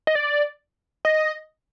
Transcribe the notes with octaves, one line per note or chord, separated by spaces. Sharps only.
D#5
D5
D#5